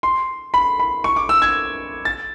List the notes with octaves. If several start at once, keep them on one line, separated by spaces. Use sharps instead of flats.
C6
B5
B5
C#6
D6
E6
G#6
A6